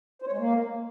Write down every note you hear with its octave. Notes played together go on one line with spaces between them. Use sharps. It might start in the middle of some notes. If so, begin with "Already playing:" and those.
C5
C#5
G#3
A#3